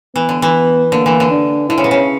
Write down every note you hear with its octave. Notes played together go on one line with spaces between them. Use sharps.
E3 B3
D3
E3
D3 A#3
E3
D3
D4
D3 E4
C#3
B2
C#3